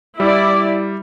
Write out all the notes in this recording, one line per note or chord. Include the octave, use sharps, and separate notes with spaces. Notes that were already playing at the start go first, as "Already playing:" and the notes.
G3 E4 D5